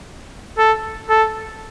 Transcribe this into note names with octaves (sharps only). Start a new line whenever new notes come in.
A4
A4